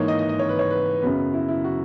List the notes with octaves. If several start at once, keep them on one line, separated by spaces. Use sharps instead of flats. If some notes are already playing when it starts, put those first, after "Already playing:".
Already playing: G#2 E3 A#3 D#4 C#5
D#5
D#5
D#5
C#5
B4
C#5
B4
F#2 C#3 F#3 B3
E4
E4
F#4